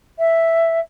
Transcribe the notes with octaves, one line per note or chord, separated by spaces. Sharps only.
E5